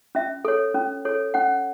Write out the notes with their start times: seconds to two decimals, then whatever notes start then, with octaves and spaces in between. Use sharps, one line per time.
0.15 C#4 E5
0.45 A4 C#5
0.74 C#4
1.05 A4 C#5
1.34 C#4 F#5